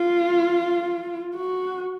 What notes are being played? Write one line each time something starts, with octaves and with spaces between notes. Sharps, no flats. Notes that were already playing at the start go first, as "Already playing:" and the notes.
Already playing: F4
F#4